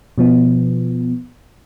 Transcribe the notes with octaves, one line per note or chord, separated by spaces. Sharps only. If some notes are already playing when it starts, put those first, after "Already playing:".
B2 F3 B3